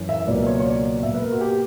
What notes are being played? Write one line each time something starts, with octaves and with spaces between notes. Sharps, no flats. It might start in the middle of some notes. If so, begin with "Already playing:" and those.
Already playing: F#2 E3
E5
C#2 B2 F#3 A#3 D5
C#5
C#5
D5
B2 A#3 E5
B4
A#4
F#4
G4